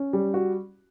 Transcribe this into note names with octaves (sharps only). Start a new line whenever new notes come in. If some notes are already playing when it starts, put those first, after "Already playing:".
Already playing: C#4
G3
F#4